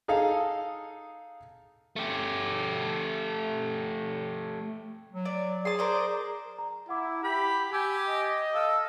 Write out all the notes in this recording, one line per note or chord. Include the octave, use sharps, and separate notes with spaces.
D#4 G#4 A4 F5
A3 G4
F#3
D5
G#4 A5 C6
A#4 C5 D5
A#5
E4 F#5 D6
G4 B5
G4 G#5 E6
D#5
A4 F5 E6 F6